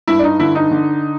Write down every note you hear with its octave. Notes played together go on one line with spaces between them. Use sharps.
G2 E4
D4
D#4
D3 E4
D#4
D3